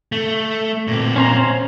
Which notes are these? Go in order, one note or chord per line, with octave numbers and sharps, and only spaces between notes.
A3
A#2 C4
C#4 C5 A#5